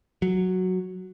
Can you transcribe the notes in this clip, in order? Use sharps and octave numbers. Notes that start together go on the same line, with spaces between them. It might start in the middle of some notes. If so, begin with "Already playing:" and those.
F#3